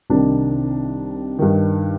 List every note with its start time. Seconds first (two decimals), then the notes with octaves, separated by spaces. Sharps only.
0.10 C2 C3 D#3 D4
1.39 G2 D#3